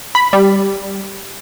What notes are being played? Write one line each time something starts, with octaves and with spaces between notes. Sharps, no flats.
B5
G3